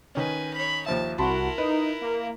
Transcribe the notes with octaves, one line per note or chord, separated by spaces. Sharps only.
D#3 C#4 B4 G#5
C#5 B5
D#2 F3 E5 A5
C2 E4 F#4 A#4 A5 B5 C6
D#4 B4
A#3